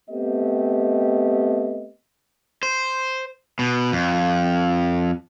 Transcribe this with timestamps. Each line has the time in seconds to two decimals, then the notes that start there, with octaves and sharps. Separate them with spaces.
0.10 A3 B3 C4 G4 D#5
2.63 C5
3.59 B2
3.92 F2